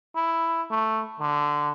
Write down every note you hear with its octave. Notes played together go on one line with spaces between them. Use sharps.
E4
A3
D3